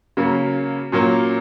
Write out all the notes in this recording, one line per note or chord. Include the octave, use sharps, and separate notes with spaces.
C#3 F#3 A#3 C#4
A#2 F#3 A#3 C#4